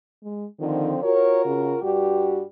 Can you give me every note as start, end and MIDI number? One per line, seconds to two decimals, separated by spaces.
0.24 0.46 56
0.60 1.00 50
0.60 0.93 51
0.60 1.00 53
0.60 1.00 60
1.03 1.81 65
1.03 1.81 66
1.03 1.81 70
1.03 1.43 73
1.46 1.73 49
1.82 2.43 43
1.82 2.43 55
1.82 2.43 66
1.82 2.43 67